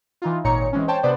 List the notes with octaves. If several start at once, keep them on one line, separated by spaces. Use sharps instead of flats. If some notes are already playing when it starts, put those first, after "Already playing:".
E3 D#4 F4
G#1 A#2 D#4 C#5 A#5 C#7
E3 G#3 C4 C#4
C5 C#5 G5 A5
C3 B3 D4 B4 C5 D5